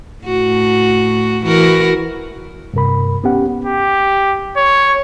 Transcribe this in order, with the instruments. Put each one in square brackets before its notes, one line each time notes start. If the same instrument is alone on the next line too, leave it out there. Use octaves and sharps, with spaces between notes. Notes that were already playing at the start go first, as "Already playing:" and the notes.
[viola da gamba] A2 F#4
E3 F#4 A#4
[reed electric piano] G2 C3 A#4 B5
B3 C#4 G4 F#5
[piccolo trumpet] G4
C#5